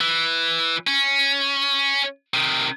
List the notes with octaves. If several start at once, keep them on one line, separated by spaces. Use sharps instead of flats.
E3
C#4
C3 D#3